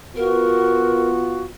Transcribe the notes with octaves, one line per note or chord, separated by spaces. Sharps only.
B3 F4 F#4 A#4